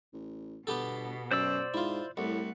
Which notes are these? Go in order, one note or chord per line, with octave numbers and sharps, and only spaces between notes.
A1
G1 B2 B3 G4 A4
F#2 C5 D5 E6
G#2 E4 F4
C2 A2 A3 F#5